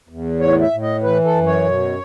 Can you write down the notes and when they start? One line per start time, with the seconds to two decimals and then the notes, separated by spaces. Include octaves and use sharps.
0.09 E2
0.40 A2 C#5
0.61 E5
0.71 A2
0.82 D#5
1.03 E3 B4
1.24 A4
1.35 F#2
1.46 C#5
1.66 B2